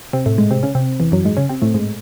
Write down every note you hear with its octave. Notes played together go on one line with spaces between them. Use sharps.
C3 C4
A2 A3
G#2 G#3
C3 C4
C#3 C#4
C3 C4
E2 E3
F#2 F#3
G#2 G#3
C#3 C#4
C3 C4
A2 A3
G#2 G#3